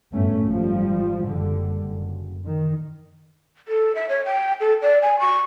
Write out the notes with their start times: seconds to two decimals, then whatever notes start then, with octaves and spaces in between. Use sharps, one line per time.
0.12 G1 F#2 A2 A3 C#4
0.43 G#1 F3 G3
1.24 F#1 D3 G3
1.84 F#1
2.45 D#3
3.68 A4
3.95 E5
4.09 C#5
4.26 G5
4.60 A4
4.82 D5
5.02 G#5
5.19 C#6